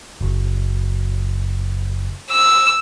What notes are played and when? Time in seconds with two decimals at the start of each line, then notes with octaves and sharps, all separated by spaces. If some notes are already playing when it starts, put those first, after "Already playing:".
0.21 F#1
2.31 E6